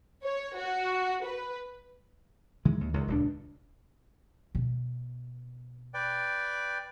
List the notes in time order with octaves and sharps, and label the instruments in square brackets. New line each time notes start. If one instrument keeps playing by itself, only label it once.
[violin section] C#5
F#4
B4
[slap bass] D#3 E3 G#3
D#2
C#2 D#3
D#1 C#2 D4
[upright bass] B2
[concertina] B4 D5 G5